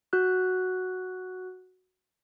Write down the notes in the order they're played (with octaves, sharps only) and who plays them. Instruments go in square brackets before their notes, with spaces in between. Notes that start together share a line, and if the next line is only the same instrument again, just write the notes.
[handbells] F#4 F#6